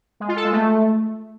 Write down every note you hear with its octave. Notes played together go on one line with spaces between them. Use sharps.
G#3
F4
A4
G#3
A3